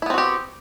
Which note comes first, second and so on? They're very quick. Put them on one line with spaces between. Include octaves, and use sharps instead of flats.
E4 B3 C4 F#4 G4